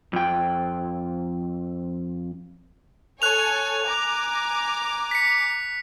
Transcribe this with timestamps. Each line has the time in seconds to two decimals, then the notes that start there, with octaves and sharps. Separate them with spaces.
0.13 F2 G5
3.22 A4 C#5 G#5 F#6 F7
3.85 G#5 A#5 D6
5.11 B6 C#7